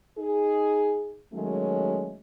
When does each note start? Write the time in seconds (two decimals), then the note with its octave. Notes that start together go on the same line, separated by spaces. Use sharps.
0.18 D#4 G#4
1.32 D#3 F#3 G#3 A3 C#4